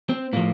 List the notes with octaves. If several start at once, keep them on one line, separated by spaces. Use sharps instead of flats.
C4
A2 F3 A#3